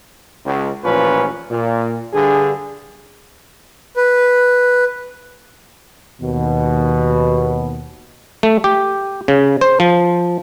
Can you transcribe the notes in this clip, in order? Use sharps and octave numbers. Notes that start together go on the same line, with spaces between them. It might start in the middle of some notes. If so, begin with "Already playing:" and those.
C#2
A1 A#2 F3 C#4 B4
A#2
G2 D3 G#4
B4
D#2 B2
A3
G4
C#3
C5
F3